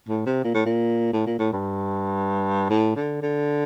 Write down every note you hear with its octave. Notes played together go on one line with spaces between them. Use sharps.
A2
C3
A#2
A2
A#2
A2
A#2
A2
G2
A2
D3
D3